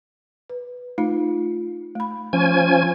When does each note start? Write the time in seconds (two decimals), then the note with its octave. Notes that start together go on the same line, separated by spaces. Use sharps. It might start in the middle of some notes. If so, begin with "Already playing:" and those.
0.50 B4
0.98 A3 D#4 F4
1.95 A3 B5
2.33 F3 C#4 G#5